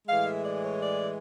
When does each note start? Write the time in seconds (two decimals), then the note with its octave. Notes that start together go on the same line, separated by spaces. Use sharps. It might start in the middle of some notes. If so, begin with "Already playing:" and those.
0.08 A2 E3 G#3 F5
0.27 E5
0.45 D5
0.64 C#5
0.82 D5